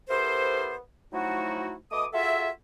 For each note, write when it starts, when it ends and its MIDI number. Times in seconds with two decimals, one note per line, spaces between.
0.09 0.76 59
0.09 0.76 64
0.09 0.76 67
0.09 0.76 69
0.09 0.76 70
0.09 0.76 72
1.12 1.74 53
1.12 1.74 54
1.12 1.74 57
1.12 1.74 63
1.12 1.74 64
1.12 1.74 66
1.91 2.05 47
1.91 2.05 57
1.91 2.05 75
1.91 2.05 86
1.91 2.05 87
2.12 2.49 65
2.12 2.49 66
2.12 2.49 68
2.12 2.49 69
2.12 2.49 76